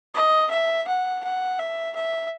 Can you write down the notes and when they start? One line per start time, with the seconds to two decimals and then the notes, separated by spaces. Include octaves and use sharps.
0.14 D#5
0.50 E5
0.87 F#5
1.24 F#5
1.59 E5
1.95 E5